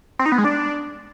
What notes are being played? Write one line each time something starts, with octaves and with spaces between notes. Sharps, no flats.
C4
D#4
B3
G#3
D4